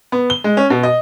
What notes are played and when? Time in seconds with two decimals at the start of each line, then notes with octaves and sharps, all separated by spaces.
0.12 B3
0.30 G7
0.44 G#3
0.57 C#4
0.70 B2
0.83 D#5